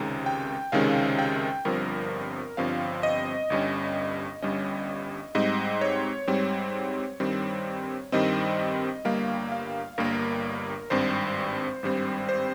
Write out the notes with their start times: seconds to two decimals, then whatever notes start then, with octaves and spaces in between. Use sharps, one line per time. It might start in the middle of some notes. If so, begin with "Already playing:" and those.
Already playing: C#2 C3 D#3 G#3 C#4 A#5
0.26 G5
0.72 C#2 C3 D#3 G#3 C#4 F5
1.19 G5
1.65 G1 G2 F3 C4 A#4
2.57 G1 G2 F3 C4 F5
3.03 D#5
3.50 G1 G2 G3 C#4
4.42 G1 G2 G3 C#4 D#5
5.35 G#2 G3 C4 D#5
5.81 C#5
6.27 G#2 G3 C4
7.20 G2 D#3 G3 C4
8.12 G2 D#3 G3 C4 D#5
9.05 G1 G2 G3 A#3 F5
9.52 F5
9.98 G1 G2 G3 A#3 A#4
10.90 G#1 G2 G3 C4 C5
11.83 G#1 G2 G3 C4 C5
12.29 C5